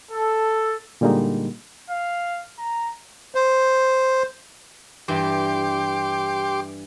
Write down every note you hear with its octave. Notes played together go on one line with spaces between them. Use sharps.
A4
A#2 D3 G3 G#3 A#3 D#4
F5
A#5
C5
G2 E3 G4 C6 D6